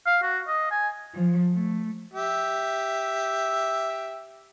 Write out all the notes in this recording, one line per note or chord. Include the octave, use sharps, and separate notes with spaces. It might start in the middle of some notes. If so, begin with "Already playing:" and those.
F5
F#4
D#5
G#5
F3
A3
G4 E5